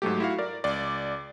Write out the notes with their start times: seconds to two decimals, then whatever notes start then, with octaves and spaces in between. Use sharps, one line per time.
0.02 G#2 F#3 A3 G4
0.20 E4 F#4 F5
0.39 A#4 D5
0.64 C#2 D5